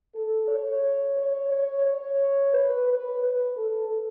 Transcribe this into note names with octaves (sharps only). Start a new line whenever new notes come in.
A4
C#5
C#5
C#5
C#5
B4
B4
B4
A4